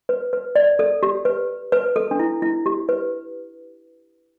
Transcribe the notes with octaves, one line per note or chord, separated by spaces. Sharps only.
B4
B4
D5
A4
G4
B4
B4
A4
D4
E4
E4
G4
B4